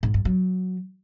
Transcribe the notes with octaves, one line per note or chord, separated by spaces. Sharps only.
G#2
G2
F#3